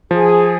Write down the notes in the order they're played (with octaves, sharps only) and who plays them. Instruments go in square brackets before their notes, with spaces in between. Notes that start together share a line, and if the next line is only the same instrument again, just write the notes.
[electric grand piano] F3 [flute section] G#4